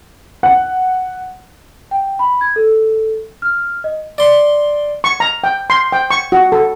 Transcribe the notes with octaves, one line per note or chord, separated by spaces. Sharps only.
F#5
G5
B5
G#6
A4
F6
D#5
D5 C6
C#6
A#5
G5
C6
G5
C#6
F#4
A4